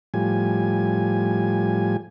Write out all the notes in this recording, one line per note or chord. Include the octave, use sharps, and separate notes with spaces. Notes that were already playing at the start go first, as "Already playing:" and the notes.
A2 F3 G3 G#5